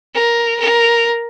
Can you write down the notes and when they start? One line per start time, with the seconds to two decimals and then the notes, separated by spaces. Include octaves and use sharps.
0.15 A#4
0.60 A#4